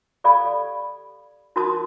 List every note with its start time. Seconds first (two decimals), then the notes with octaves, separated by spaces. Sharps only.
0.24 G4 A4 D5 F5 B5
1.56 D#4 F#4 A#4 A5 C6 D#6